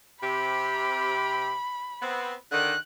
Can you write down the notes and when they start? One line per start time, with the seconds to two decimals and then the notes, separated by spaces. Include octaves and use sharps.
0.23 C3 G4 B5
2.02 B3 C4
2.52 D3 D#3 F#6